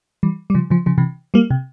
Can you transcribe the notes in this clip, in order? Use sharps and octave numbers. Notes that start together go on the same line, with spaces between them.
E3 G3
G3
C#3 F3
C#3 F3
C#3 F3
C3 E3
G3 A#3
C3